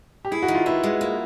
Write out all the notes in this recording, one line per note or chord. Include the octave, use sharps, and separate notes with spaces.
G4
E4 G#4
F#4
D#3
F4
B3 E4
G#3
A#3